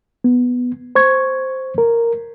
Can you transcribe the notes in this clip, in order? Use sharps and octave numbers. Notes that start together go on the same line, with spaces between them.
B3
C5 C#6 G#6
A#4